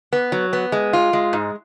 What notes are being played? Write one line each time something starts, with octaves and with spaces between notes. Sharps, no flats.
B3
F#3
B3
G#3
F4
G#3
G#2